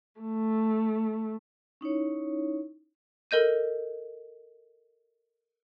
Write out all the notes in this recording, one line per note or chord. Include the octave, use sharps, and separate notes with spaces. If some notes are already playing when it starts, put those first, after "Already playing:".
A3
C#4 D#4 E4 C#5
A4 A#4 D#5 G6 D#7